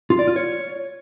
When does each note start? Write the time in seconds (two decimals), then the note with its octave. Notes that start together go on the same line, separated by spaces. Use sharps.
0.10 F4
0.19 D5
0.27 F4
0.36 C#5